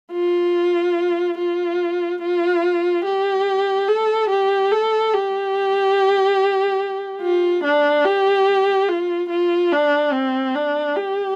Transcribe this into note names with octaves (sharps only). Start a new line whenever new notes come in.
F4
F4
F4
G4
A4
G4
A4
G4
F4
D4
G4
F4
F4
D4
C4
D4
G4